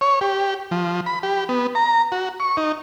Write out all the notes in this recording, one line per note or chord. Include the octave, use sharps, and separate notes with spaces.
C#5
G4
F3
B5
G4
B3
A#5
F#4
C#6
D#4